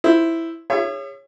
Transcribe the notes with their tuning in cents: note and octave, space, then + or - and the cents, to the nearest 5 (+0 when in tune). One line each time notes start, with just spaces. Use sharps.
E4 +0 C5 +0
G#4 -35 C#5 -5 E5 +30